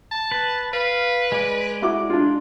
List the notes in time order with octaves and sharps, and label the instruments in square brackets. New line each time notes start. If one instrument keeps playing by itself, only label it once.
[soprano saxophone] A5
[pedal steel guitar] B4
[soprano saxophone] B4 [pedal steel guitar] F5
[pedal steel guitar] G#3 D5
[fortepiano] E4 F#4 D6
D4 F4